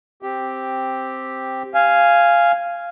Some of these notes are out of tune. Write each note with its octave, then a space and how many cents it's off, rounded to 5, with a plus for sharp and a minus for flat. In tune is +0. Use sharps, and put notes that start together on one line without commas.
C4 +0 G4 +0
F5 -10 G#5 +0